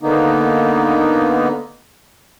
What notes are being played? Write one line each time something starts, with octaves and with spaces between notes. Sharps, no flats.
D3 A#3 B3 D#4